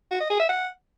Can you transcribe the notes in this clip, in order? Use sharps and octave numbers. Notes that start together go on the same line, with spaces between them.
F#4
D#5
G#4
E5
F#5